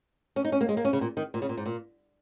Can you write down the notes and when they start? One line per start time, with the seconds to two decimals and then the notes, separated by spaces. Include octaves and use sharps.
0.36 C#4
0.45 D#4
0.52 C#4
0.61 A#3
0.69 G#3
0.77 A#3
0.85 C#4
0.93 C#3
1.01 A#2
1.17 D#3
1.34 A#2
1.42 C#3
1.49 A#2
1.57 G#2
1.66 A#2